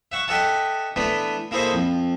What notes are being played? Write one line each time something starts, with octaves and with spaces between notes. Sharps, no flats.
E5 F#5 C#6
G4 A4 D#5 E5 F#5 A5
E3 A3 B3 D4
A#3 E4 G#4 A4 C5 D#5
F2